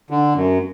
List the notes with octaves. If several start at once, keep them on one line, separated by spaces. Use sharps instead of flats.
D3
F#2